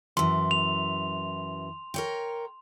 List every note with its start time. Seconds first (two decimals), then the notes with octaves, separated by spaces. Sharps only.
0.17 F#2 E3 C6
0.51 F7
1.94 A#4 C#5 G5